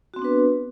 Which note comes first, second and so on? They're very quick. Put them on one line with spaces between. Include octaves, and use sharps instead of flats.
F#4 C4 B3 D4 B4